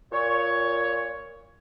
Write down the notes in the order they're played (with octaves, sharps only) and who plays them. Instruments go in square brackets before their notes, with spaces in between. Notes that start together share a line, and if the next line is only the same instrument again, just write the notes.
[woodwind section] A#2 C#5